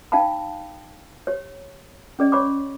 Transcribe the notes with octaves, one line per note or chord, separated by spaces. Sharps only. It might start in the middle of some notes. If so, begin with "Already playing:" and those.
D#4 F5 G5 A5 B5
G4 C#5
C#4 G#4 D5 D#5
C#5 B5 C#6 D6